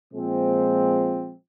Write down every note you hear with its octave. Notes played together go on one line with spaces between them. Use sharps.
A#2 F3 G#3 C4